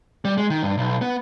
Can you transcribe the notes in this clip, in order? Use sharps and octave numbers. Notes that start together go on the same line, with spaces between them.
G3
G#3
D#3
G2
B1
B3